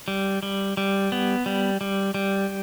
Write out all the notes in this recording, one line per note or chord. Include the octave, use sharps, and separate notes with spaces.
G3
G3
G3
B3
G3
G3
G3